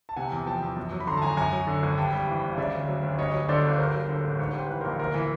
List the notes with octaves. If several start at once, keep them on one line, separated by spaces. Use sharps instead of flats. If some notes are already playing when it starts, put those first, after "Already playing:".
A5
C3 F#5 G#5
E2
F3 G5 A5
E2
F#2
F#3
B5
D3 A#5 C6
A5
G#1 G#5 A#5
F#2 G#5 A#5
F#3
D3
G#1
G2 G5 A5
G3
E3
G1
C#3 D5 E5
D2
F#3
D2
G2 C#5 D#5
F#3
D3 C5 D5
G1
G2 A#4 C5
F#3
D3
A1
G#2 C#5
G3 C5
E3 B4
A#4 C5
A#1
D2 A#4 C5
E3